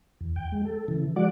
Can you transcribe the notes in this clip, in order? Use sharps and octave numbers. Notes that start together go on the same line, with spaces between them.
E2
G5
G#3
A4
C#3 E3
F3 G#3 F#4 D5 F#5 D6